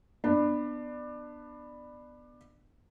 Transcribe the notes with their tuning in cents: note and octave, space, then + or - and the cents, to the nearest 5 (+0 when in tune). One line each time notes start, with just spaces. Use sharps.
B3 +0 D4 +20